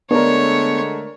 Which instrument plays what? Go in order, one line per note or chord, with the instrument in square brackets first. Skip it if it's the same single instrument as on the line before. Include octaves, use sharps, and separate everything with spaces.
[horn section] D3 G#3 A3 [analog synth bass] B3 [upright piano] D4 A#4 [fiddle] C#5